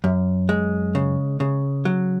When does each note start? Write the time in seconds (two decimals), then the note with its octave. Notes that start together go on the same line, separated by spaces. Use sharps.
0.04 F#2
0.49 G#3
0.95 C#3
1.40 C#3
1.85 F#3